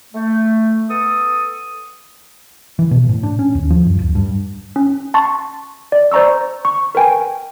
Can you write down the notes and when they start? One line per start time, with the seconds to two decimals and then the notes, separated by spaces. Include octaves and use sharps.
0.13 A3
0.89 B3 A4 D#6
2.79 E3
2.91 B2
3.09 A2
3.23 D4
3.39 C#4
3.55 D#2
3.70 F3
3.86 F#2
3.99 D1
4.15 G2
4.76 C#4
5.14 A5 C6 C#6 A6
5.92 D5
6.12 C5 D5 A#5 C#6 E6
6.65 C#6
6.95 A#4 B4 G5 G#5